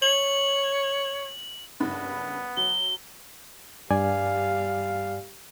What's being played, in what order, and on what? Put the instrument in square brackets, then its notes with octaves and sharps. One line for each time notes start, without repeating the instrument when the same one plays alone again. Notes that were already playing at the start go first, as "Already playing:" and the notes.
[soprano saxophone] C#5 [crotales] F#7
[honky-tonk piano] F#1 G2 B5 [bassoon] B3
[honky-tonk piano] F#3 [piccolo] G7
[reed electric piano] G2 D5 G#5 [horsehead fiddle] G3 F5